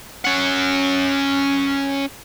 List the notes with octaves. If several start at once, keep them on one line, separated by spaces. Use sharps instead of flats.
C#4 F#5